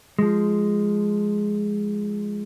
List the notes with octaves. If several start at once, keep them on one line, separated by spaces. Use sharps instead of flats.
F3 G#3